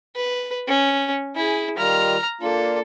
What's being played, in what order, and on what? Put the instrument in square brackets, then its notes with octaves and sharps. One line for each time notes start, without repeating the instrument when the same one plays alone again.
[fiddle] B4
C#4
[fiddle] E4 G#4 [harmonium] G#5
[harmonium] D#3 G3 F4 [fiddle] A#5 F6
[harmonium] A#3 D4 F4 [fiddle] A4